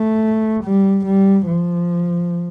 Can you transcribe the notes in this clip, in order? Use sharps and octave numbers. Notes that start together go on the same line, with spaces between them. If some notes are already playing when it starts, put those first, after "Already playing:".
Already playing: A3
G3
G3
F3